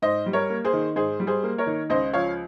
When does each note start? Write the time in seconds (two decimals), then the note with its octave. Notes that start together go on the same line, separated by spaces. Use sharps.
0.02 G#2 C5 D#5
0.26 G3
0.33 A#4 C#5
0.50 A#3
0.64 G#4 C5
0.73 D#3
0.96 G#2 G#4 C5
1.20 G3
1.27 G#4 C5
1.43 A#3
1.58 A#4 C#5
1.66 D#3
1.89 C#2 C5 D#5
2.13 F3 C#5 F5